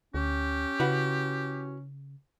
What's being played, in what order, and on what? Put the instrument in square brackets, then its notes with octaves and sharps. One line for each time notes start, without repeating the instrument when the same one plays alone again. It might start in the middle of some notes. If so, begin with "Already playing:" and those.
[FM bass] D2 [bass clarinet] C#4 [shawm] G4
[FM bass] C#3 [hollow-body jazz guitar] E4 F#4 B4